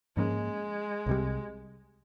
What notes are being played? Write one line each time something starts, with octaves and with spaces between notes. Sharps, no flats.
G#2 F3 G#3 A#3 C#4
C2 C3 G3